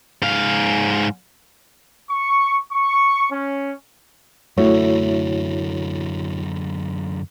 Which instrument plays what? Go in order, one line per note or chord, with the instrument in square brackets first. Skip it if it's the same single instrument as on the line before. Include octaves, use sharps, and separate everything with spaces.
[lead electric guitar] G#2 F5
[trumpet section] C#6
C#6
C#4
[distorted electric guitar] F#2 D3 [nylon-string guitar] A3 [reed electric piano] E4 F#4 C#5